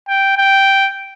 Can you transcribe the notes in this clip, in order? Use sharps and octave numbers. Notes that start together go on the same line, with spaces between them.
G5
G5